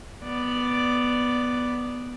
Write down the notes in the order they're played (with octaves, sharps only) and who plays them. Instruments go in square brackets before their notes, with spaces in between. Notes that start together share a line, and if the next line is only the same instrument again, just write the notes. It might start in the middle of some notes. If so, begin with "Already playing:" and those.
[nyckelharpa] B3 D5